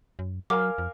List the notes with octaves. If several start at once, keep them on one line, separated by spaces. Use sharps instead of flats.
F#2
F#3 A#4 F5 G#5 D6
F2